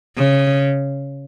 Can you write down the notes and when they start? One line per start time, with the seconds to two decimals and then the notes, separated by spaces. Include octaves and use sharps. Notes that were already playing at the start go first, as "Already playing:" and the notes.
0.17 C#3